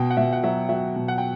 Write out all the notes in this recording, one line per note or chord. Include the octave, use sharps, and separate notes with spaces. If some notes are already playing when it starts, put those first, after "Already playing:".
Already playing: B2 G5
F#5
B2 E5
F#5
F#3 E5
F#3 E5
B2
F#5
G5